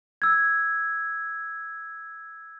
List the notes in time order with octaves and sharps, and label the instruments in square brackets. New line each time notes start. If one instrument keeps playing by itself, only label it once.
[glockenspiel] E6 G#6